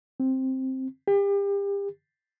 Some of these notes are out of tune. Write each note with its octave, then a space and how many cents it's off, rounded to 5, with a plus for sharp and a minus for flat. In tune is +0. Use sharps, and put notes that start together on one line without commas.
C4 +5
G4 +35